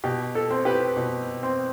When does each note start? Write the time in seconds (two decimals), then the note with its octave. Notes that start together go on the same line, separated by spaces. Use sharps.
0.04 B2 G4
0.35 A4
0.50 C4
0.65 G4 B4
0.97 B2
1.43 C4